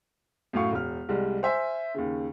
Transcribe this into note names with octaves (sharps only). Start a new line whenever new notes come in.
F#2 A2 F5 C#6
E1 F6
C2 G3 G#3
C5 E5 G#5
D#2 C#3